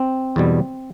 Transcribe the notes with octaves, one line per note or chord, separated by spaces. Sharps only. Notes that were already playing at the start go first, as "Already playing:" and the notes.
Already playing: C4
E2 B2 G3